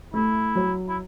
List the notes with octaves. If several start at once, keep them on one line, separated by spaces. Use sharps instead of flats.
A3 E4
F#3
E4